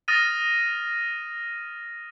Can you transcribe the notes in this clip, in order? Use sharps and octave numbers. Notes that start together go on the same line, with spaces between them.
D#6 F6 A6 A#6 D#7